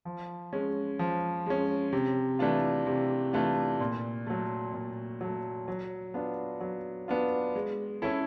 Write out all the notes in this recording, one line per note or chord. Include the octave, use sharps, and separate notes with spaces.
F3
G#3 C#4
F3
G#3 C#4
C3
E3 A3 D4 F4
C3
E3 A3 D4 F4
A#2
F#3 A3
A#2
F#3 A3
F#3
B3 D4 F4
F#3
B3 D4 F4
G#3
C#4 E4 A4